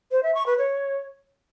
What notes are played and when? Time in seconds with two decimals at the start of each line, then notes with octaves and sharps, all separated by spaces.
0.11 C5
0.23 E5
0.35 C#6
0.46 B4
0.58 C#5